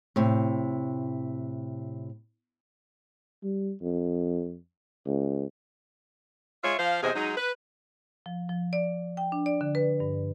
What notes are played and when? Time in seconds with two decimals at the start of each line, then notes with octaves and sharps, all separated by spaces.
0.16 A2 C3
3.44 G3
3.82 F2
5.06 C#2
6.63 G#3 F4 C#5 E5
6.79 F3 C5 F5
7.03 E2 C3 G#4 C5 D#5
7.16 F#3 G#3 D#4
7.37 B4
8.26 F3
8.49 F3
8.73 D5
9.17 G5
9.32 D4
9.46 D5
9.61 D3
9.75 B4
10.00 G2